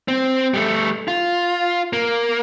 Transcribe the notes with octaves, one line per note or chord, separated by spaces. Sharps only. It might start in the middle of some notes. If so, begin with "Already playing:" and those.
C4
G3 A3
F4
A#3